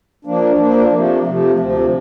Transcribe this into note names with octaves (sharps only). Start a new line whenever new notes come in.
F3 A#3 D4
F3 A#3 D4
C3 F3 A3
C3 F3 A3
D2 C3 F3